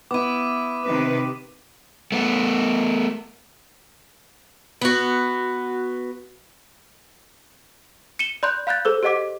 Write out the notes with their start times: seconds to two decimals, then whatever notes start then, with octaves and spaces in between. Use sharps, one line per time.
0.11 B3 E4 D6 D#7
0.86 C3 D#3 B4
2.12 A3 B3
4.81 B3 F#4
8.19 C#7 D#7 E7 G7
8.43 D5 B5 C6 F#6 G6
8.67 F5 B5 F#6 G6 A6
8.85 G#4 A4 C5 E6
9.03 G4 C5 D#5 F#5 D6 B6